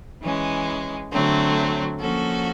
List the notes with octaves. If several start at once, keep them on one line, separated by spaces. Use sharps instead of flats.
E3 G#3 C#4
D3 F#3 A3 C4
F3 A#3 C#4 F#4 A4